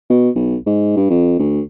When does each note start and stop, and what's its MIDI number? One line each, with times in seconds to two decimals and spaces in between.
0.10 0.30 47
0.35 0.57 35
0.66 0.92 44
0.97 1.06 43
1.10 1.35 41
1.39 1.61 38